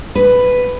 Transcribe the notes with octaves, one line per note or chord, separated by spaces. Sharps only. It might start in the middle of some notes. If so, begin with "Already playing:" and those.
B4